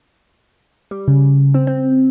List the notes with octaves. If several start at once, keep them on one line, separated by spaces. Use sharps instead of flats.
G3
C#3
C4
C4